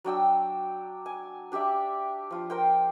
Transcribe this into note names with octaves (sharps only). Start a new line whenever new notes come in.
F#3 D4 G5 E6
G#5
D4 G4 D5 E5
F3 F4
A#4 C5 G5